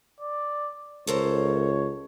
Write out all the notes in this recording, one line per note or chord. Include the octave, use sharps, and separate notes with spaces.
D5
C#2 A4 A#4 C5 C#5